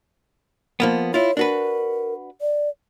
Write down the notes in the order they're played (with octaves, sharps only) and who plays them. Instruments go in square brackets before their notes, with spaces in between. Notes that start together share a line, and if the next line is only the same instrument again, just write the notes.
[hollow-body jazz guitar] F3 A#3 B3
[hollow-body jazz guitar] E4 F4 [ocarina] C#5
[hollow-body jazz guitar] D4 F#4 B4 [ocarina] A#4
[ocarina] D5